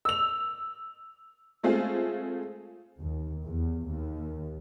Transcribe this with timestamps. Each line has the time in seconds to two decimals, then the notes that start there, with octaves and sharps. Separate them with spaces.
0.05 E6 F7
1.63 G#3 A3 C4 F4 G#4
3.00 D#2
3.46 E2
3.89 D#2